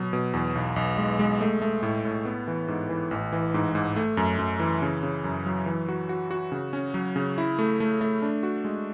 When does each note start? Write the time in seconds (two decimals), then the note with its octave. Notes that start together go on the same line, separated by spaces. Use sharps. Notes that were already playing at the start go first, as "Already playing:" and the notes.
Already playing: B2 F#3
0.13 B2
0.33 E2
0.55 B1
0.76 B1
0.98 G#3
1.19 G#3
1.41 A3
1.62 A3
1.83 A2
2.05 A2
2.25 B3
2.48 E3
2.68 G#2
2.89 E3
3.11 A1
3.32 E3
3.54 G#2
3.75 G#2
3.96 A3
4.17 F#2
4.39 F#2
4.60 E3
4.82 C#3
5.03 C#3
5.24 F#2
5.46 F#3
5.66 E3
5.89 F#4
6.09 F#4
6.31 F#4
6.52 C#3
6.73 C#4
6.94 F#3
7.16 C#3
7.38 E4
7.59 A3
7.80 A3
8.01 A3
8.22 D4
8.43 F#4
8.65 G#3